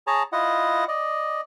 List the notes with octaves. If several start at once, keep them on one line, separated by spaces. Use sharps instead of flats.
G#4 C#5 A5 A#5
E4 F4 D#5 F#5
D5 D#5